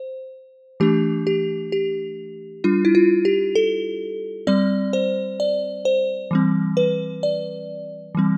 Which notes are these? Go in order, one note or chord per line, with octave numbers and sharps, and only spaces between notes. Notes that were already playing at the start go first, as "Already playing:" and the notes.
Already playing: C5
E3 A3 D4 G4
G4
G4
G3 D4 F4
E4
F4
G4
A4
G3 C4 D5
C5
D5
C5
E3 G3 C4
B4
D5
E3 G3 C4